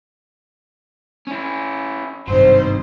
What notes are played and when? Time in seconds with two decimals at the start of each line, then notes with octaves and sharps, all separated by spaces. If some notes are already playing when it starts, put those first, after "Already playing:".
1.27 C#4 E4
2.28 G#1 G2 C3 F#3 D#4 C5